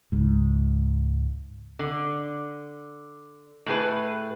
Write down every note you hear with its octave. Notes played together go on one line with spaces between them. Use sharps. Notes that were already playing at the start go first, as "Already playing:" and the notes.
C#2 G#2
D3
A2 A3 G#4 B4